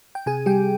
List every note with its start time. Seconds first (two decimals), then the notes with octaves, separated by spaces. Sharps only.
0.15 G5
0.26 C3 G#4 G#5
0.46 G3 G4 G5